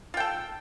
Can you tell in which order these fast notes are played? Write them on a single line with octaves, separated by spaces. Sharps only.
F4 G5 A4